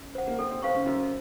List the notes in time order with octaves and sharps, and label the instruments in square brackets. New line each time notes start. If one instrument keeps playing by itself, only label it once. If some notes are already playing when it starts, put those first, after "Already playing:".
Already playing: [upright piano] C#4
[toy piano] C5 F#5
[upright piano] A#3
[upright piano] C4 [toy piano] A4
[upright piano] C4
[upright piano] C4 [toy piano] C5 F5 A#5 C#6
[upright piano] C#3
[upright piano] F#2 [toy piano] A4